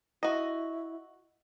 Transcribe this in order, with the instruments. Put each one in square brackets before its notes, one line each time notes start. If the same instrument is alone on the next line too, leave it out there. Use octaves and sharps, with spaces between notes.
[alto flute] E4 [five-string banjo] F#4 D#5